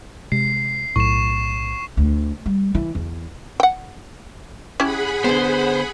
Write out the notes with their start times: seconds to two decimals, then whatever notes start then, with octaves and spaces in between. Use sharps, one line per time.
0.32 C3 G#3 C7
0.96 B1 A2 C#6 E7
1.97 D2
2.46 G3
2.75 E3
2.95 E2
3.60 F#5 G5
4.80 C#4 E4 G4 G#4 F#5 B5
5.24 D3 B3 C5